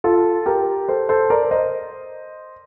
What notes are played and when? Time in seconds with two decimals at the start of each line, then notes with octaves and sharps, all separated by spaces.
0.04 F4 A4
0.46 G4 A#4
0.89 A4 C5
1.09 A4 C5
1.30 A#4 D5
1.51 C5 D#5